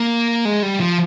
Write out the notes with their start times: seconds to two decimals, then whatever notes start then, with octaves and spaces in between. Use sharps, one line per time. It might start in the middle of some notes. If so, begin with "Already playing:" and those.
Already playing: A#3
0.45 G#3
0.63 G3
0.80 F3